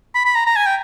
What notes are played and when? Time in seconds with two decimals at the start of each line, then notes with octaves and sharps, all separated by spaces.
0.14 B5
0.25 B5
0.35 A#5
0.46 A#5
0.56 G#5
0.66 G5